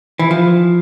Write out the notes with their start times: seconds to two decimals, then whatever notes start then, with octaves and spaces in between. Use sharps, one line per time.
0.19 E3
0.31 F3